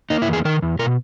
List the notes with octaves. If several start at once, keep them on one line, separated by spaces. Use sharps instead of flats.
A#3 D#4
E4
E2 G#4
D#3 A#4
E2
B2 A#4